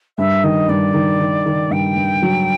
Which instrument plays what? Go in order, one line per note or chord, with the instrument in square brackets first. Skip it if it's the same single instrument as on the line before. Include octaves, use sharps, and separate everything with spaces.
[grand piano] G2 [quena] E5
[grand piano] D#3 [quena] D#5
[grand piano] G2 [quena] D5
[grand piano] D#3
D#3
D#3
[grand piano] G2 [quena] G5
[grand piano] G2
F#3